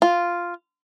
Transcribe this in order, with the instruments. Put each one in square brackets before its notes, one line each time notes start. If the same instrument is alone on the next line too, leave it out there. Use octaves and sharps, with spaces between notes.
[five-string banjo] F4